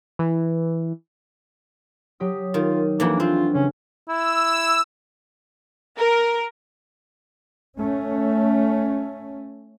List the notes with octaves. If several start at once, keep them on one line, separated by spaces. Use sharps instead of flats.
E3
F#3 G4 D#6
D#3 F4
F2 E3 A#3 D4 F#4 F#5
C4 F4
C#3 C#4
E4 E6
A#4
A3 C#4